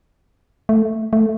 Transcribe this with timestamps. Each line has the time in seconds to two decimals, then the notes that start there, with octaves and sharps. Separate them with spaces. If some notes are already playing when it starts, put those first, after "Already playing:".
0.69 A3
1.13 A3